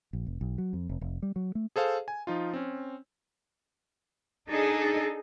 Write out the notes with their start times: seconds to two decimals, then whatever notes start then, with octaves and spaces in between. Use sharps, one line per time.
0.13 A#1
0.26 F1
0.41 B1
0.58 F#3
0.73 F2
0.89 F1
1.01 F1
1.22 G3
1.36 F#3
1.55 A3
1.76 G#4 A4 C5 F5
2.08 G#5
2.27 F3 D#4 F4
2.53 C4 C#4
4.49 D4 D#4 G#4 A4